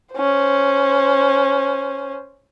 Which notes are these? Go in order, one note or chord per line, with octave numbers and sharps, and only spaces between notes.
C#4 C5